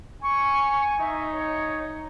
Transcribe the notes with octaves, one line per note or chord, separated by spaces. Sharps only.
G#5 C#6
D#4 E5
C#5